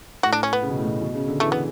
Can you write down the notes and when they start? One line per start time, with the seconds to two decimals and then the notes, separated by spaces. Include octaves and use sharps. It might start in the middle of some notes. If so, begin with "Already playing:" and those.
0.23 A2 F#4
0.33 D4
0.43 C#4
0.53 B3
0.62 C#3
0.70 B2
0.77 A2
0.85 B2
1.01 B2
1.15 C#3
1.28 D3
1.40 E3 A3
1.52 B3